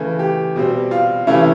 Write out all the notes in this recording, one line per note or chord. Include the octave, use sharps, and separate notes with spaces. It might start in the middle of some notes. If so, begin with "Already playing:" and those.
Already playing: C#3 E3 A3
G4
B2 G3 C4
F4
C3 E3 A3 C#4 E4